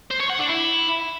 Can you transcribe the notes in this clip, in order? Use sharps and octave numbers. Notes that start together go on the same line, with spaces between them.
C5
C#5
F#5
D4
E4